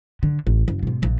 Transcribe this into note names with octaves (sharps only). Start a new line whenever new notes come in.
D3
A1
F#1
G#2 B2
A#1 A#2